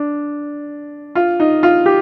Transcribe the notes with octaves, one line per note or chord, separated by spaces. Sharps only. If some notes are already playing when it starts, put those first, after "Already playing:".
Already playing: D4
F4
D#4
F4
G4